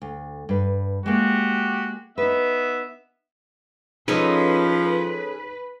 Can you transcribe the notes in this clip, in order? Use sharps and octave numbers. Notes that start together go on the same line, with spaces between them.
D2
G2 B4
G#3 A#3 F#4 G4
B3 D#4 B4 E5
F3 C#4 D#4 G#4 A4 B4 D#5